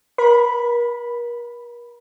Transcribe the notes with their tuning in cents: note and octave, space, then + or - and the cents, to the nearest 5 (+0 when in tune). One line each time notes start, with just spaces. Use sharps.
A#4 +40 B5 +0